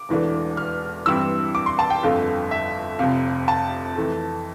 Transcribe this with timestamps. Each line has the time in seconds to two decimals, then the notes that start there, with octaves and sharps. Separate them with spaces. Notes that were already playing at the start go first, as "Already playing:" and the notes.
Already playing: D6
0.09 E1 E2 E3 A3 D4
0.57 F6
1.06 G2 E3 G3 C4 E4 E6
1.55 D6
1.66 C6
1.79 A5
1.90 G5
2.03 G1 F2 D3 A3 F5
2.51 E5
2.99 F1 F2 C3 F5
3.48 A5
3.96 F2 E3 A3